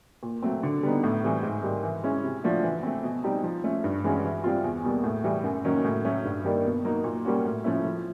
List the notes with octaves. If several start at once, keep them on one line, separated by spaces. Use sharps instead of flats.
A#2
F#3 A3 C4
D3
G3 B3 D#4
A2
E3 G3 C4
G#2
D#3 G3
E3
G#3 C#4 E4
C3
F3 A3 D4 F#4
E3
A3 C4
B2
G3 C4 D#4
F3
A3 C#4
G2
E3 G#3 C#4 F#4
E3
G3 C4 F4
E2
B2 G3 A#3
A2
E3 G3
F#2
D#3 F#3 A#3 C#4
A2
F#3 A3 C#4
G2
D#3 G3 A#3 D4
B2
F#3 A#3 D#4
A#2
G3 A#3 C#4 F#4
A2
F3 A3 C#4 E4
F3